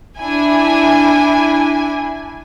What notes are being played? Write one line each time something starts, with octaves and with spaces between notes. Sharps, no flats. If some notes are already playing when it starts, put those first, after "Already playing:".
D4 E4 G#5